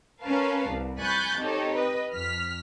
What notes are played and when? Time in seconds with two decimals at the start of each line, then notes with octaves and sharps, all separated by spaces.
0.23 C#4 A#4 B4 F5 A5
0.67 C2
0.99 G#5 B5 C#6 F#6 G6 A6
1.38 C4 D#4 G4 A4 C#5
1.75 B4 D#5
2.13 F2 F6 B6